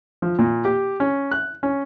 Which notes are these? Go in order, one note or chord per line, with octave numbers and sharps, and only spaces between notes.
F3
A#2
G4
C#4
F#6
C#4